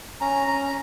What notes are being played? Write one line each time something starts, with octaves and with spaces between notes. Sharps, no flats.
C#4 A#5
C#4 A#5